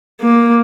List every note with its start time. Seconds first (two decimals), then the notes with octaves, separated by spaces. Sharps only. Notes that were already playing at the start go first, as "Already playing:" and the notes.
0.21 A#3